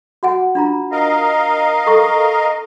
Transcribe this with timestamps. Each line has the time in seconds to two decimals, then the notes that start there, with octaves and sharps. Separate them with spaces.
0.23 F#4 F#5 G#5
0.55 D4 F4 A#5
0.92 A#4 D#5 F5
1.87 A4 G#5 C#6